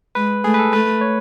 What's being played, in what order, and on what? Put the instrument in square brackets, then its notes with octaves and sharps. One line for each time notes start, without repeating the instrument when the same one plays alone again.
[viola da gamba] G#3 [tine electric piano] B4
[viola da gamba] A3 [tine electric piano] G#4
[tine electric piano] B4
A4
[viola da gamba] A3 [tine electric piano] B4
[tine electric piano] C#5